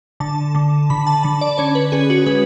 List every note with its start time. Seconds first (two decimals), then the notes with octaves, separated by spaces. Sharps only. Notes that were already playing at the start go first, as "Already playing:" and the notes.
0.20 D3 A5
0.55 D3
0.90 D3 B5
1.07 A5
1.23 D3 A5
1.41 D5
1.58 C#4 C#5
1.75 B4
1.92 C#4 G#4
2.10 F#4
2.26 G#3 B4